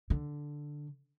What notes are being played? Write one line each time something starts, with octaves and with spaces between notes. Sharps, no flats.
D3